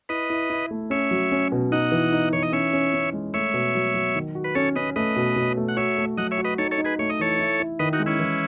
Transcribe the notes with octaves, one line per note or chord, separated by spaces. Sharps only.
E4 B4 D#5
E4
E4
A3
C#4 C#5 E5
F#3
C#4
B2
D#4 D#5 F#5
E3
D#4
E3 C#5
D#5
C#4 C#5 E5
C#4
C#4
G#3
A3 C#5 E5
B2
F#3
F#3
D#3
F#4
B4
C#4 A4 C#5
C#4 B4 D#5
A3 B4 D#5
B2
B2
A3
F#5
F#4 C#5 E5
A3
F#3 D#5 F#5
C#5 E5
F#4
B4 D#5
D#4 A4 C#5
A4 C#5
D#4
G#4 B4
A3 C#5
D#5
E3 A4 C#5
E4
E4
D#3 B4 D#5
D#4 F#4
G#3
C#4 E4
E3